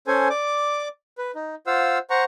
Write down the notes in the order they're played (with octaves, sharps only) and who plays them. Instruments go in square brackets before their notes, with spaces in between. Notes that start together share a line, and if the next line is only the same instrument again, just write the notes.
[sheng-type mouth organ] C#4 A4 C5 G#5
D5 D6
B4
D#4
F4 C5 F5 F#5 E6
C5 F#5 A#5 C#6